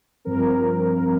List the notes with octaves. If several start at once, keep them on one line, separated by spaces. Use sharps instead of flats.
G2 F3 C4 A#4